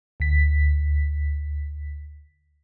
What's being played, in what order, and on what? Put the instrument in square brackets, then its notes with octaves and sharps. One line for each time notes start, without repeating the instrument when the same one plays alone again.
[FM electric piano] D2 B6